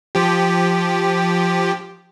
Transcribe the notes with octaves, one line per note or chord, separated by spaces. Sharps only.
F3 G4